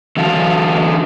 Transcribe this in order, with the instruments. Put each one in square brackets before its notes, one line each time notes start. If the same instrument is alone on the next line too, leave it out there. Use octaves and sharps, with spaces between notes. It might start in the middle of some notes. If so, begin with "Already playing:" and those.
[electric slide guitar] D3 E3 F#4 F5 A5